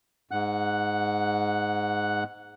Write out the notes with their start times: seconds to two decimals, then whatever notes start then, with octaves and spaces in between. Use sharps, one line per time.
0.31 G#2 F#5 F#6